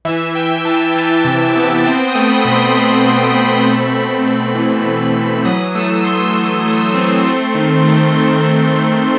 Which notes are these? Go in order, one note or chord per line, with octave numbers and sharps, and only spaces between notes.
E3 E5
E3 G5
E3 A5
E3 A5
G5
A5
C3
B3
C4 G5
D#6
A3
B5
B2
C6
A3 D#6
C4 C6
B2 D#6
A3 B5
A3
C4
E3
E3
E3
F#3 D#6
A3 E6
F#3 C6
F#3 C6
A3
C4
A3
D#3
A3
D#3
D#3
D#3